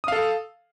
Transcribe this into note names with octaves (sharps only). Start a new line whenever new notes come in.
A4 F5 D#6